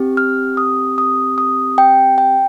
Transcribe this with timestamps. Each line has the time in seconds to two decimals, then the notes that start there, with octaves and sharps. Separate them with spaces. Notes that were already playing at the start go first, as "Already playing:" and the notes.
Already playing: C4 G4
0.17 F6
0.57 D#6
0.98 D#6
1.38 D#6
1.78 G5
2.18 G5